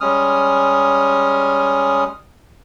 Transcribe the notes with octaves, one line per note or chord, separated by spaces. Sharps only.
G3 G#3 C#4 D#6 F6